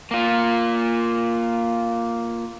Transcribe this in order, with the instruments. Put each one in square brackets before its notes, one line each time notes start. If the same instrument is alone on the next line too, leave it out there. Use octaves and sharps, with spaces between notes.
[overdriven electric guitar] A#3 F4